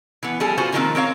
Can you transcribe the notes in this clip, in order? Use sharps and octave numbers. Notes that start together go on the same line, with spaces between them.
E3 B3
F3 G3 G#4 A4
F4 F#4 G#4 C5
B2 D#3 F3 G#3 A#3 C4
C4 A#4 C#5 F5